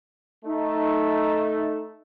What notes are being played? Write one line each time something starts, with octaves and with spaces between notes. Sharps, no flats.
A3 D#4